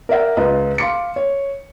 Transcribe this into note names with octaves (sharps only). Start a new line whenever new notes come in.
A#4 D5 E5 F#5
C#2 F4 B4 D#5 A#5
F5 C6 D6 C#7
C#5